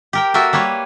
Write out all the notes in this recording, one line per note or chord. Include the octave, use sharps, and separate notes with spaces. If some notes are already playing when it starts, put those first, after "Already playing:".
G4 A#4 G5
A#3 F#4 A4 A#4 E5
G3 A#3 B4 C#5